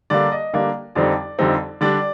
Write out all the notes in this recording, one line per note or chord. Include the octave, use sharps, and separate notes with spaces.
D3 G3 A#3 D4 D5
D#5
D3 G3 A#3 D4
F2 D3 G3 C4 D#4 D5
F2 D3 G3 C4 D#4
D3 G3 D4 D5